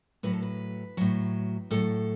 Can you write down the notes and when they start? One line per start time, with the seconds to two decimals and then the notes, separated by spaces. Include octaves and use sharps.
0.23 A2 F#3 B4
0.33 A4
0.42 B4
0.97 A2 F#3
1.71 A2 F#3 A4